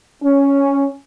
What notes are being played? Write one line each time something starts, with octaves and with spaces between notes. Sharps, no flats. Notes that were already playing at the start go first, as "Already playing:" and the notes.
C#4